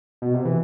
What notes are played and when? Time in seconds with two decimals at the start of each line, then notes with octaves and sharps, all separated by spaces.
0.22 B2
0.34 C3
0.45 E3